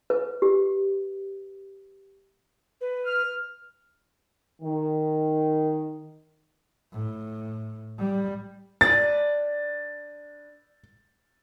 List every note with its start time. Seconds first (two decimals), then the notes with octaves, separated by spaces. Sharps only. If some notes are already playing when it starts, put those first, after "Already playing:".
0.10 B4
0.42 G4
2.81 B4
3.05 F6
4.62 D#3
6.92 A2
7.99 G3
8.81 D4 B4 D5 A6